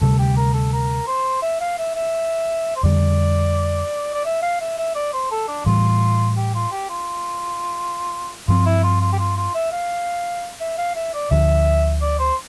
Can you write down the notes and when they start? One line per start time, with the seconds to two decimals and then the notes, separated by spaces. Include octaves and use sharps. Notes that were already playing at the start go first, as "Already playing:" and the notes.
0.01 D2 C3 G3 A4
0.19 G4
0.37 A#4
0.54 A4
0.72 A#4
1.07 C5
1.42 E5
1.61 F5
1.78 E5
1.95 E5
2.76 C5
2.83 F2 D3 G3 D5
4.14 D5
4.25 E5
4.43 F5
4.61 E5
4.78 E5
4.95 D5
5.13 C5
5.31 A4
5.48 D4
5.66 A2 E3 G3 F4
6.37 G4
6.55 F4
6.72 G4
6.90 F4
8.48 G2 F3 C4 F4
8.66 E4
8.83 F4
9.01 F4
9.13 G4
9.18 F4
9.37 F4
9.55 E5
9.72 F5
10.60 E5
10.78 F5
10.95 E5
11.14 D5
11.31 D2 D3 F3 E5
12.02 D5
12.19 C5